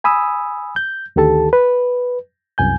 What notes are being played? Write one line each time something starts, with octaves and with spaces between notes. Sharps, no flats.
G#5 B5 D#6 E6
G6
D2 D#3 G4 A4 A5
B4
C2 F#2 G#5 G6